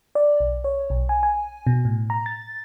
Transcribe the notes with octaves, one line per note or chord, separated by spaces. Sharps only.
D5
B1
C#5
B1
G#5
G#5
B2
A2
A#5
A6